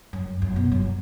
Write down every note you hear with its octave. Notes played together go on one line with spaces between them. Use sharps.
F#2
F#2
B2
F#2